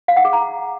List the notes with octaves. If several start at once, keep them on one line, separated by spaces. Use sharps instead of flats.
F5
F#5
G#4
A#5